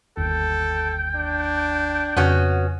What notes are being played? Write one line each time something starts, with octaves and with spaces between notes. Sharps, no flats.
G1 D#2 A4 G5
D4
F2 C#3 B3 C#4 F#4